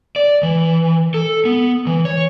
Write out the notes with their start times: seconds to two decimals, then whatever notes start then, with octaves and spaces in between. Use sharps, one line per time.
0.16 D5
0.43 E3
1.14 A4
1.45 B3
1.87 E3
2.05 C#5